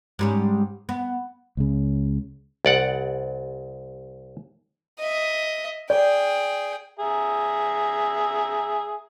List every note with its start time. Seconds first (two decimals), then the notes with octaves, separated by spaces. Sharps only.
0.19 G#2 G3 C#4
0.89 B3
1.57 C#2 C#3
2.65 C2 D5 F#5
4.99 D#5 E5
5.90 G#4 D5 G5
6.99 G#4 E5 A#5